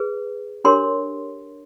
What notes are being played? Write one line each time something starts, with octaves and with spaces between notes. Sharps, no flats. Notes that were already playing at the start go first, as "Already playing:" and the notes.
Already playing: G#4 B4
D4 G4 A#4 C#5 C6